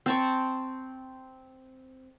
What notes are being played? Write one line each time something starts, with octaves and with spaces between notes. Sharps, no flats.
C4 A5 C#6